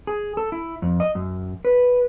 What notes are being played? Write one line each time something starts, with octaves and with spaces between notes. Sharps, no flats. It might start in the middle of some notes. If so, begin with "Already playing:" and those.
G#4
A4
E4
F2
D#5
F#2
B4